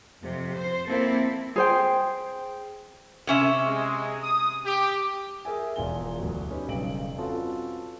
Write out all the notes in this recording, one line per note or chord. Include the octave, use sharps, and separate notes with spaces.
F2 C3
C5
A#3 C4 E4 A4
G#4 C5 G5
C3 C#4 E5
G#3
D#6
G4
G#4 A#4 E5 G#5
E1 E2 F3 F4 G#5 G7
D2 B2 F#3
C#4 D#4 G4 B4
E1 B1 G2 C#3 D7 F#7
C4 C#4 F4 F#4 A4 B4